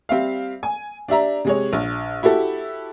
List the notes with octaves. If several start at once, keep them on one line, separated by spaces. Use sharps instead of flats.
G3 C4 E5 F5
G#5
D4 G4 E5 A#5
C3 G#3 C#5
A#1
E4 F#4 G4 A4